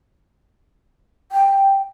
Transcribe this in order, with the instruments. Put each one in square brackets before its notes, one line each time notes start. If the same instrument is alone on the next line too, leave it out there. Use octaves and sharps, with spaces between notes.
[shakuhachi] G5